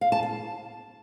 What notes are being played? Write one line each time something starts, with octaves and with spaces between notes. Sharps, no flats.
F5
A5
A5